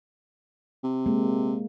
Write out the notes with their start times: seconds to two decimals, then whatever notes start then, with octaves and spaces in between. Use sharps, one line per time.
0.84 C3
1.06 G#3 A#3